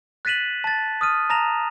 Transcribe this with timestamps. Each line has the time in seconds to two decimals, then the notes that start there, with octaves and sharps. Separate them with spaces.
0.25 F#6 A6 B6 D#7 E7 F#7
0.64 A5 A6
1.01 D#6 F6 D#7
1.30 A5 A#5 A#6 E7 F7